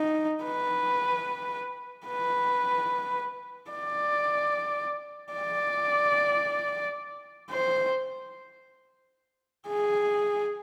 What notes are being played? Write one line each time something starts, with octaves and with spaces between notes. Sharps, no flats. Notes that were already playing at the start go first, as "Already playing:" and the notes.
Already playing: D#4
B4
B4
D5
D5
C5
G#4